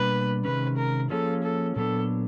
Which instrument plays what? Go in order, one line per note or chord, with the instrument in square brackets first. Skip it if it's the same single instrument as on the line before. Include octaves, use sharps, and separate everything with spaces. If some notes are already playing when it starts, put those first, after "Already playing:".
Already playing: [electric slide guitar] B2 G3 A#3 D4 [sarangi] B4
[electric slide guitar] C3 D#3 G#3 C#4 [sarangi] B4
[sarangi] A#4
[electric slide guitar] F3 A#3 C#4 F4 G#4 [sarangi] A4
[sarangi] A4
[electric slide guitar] A#2 F#3 B3 D4 [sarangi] A4